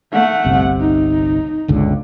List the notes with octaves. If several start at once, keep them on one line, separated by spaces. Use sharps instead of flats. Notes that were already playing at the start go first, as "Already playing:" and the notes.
A3 F#5
G1 C2 C3
D#4
G1 C#2 D3